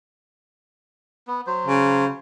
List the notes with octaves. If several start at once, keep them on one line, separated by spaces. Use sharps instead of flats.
B3
F#3 C5
C#3